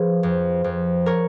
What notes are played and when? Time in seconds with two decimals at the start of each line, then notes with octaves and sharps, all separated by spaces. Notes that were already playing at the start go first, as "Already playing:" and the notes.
Already playing: F3 G#4 B4
0.23 F2
0.64 F2
1.06 A#4 C#5